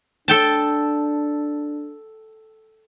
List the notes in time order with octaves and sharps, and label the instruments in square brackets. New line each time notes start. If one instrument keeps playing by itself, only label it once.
[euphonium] D4 [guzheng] A4 G5 A5